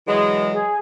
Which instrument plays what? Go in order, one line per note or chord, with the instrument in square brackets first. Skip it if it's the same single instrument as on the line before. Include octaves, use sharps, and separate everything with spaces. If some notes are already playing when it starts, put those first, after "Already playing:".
[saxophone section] E3 F#3 G#3
[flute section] G#4